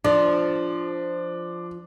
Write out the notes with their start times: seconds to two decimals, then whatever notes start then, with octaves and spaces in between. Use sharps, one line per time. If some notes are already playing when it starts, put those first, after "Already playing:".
0.04 F3 D4